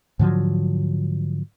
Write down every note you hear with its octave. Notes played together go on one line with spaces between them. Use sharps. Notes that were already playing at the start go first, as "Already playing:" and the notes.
G#2 D3 F3 F#3